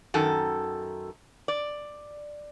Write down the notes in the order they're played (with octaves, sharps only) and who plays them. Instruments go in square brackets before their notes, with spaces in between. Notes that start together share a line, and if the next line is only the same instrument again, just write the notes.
[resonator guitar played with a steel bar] F#2 D#3 A4
D5